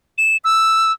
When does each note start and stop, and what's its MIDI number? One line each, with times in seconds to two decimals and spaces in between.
0.18 0.37 100
0.45 0.92 88